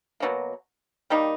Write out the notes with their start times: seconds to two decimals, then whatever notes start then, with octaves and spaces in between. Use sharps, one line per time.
0.20 B2 F#3 A#3
1.10 D#3 G3 A#3 D#4